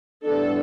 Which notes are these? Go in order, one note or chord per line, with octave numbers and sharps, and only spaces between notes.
A2 E3 G3 B3 D4 A4